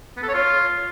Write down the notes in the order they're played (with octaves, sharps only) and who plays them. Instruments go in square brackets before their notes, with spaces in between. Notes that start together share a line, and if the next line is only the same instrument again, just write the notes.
[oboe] B3
A4
C#5
F4